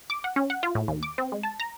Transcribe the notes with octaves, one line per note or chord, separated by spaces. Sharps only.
D6
F#5
C#4
F#5
F4
A2
D#2
D6
C4
G#3
A5
A#5